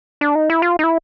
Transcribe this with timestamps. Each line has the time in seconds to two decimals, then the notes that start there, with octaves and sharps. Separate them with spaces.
0.21 D4
0.35 D#4
0.50 E4
0.62 F4
0.79 D#4
0.84 E4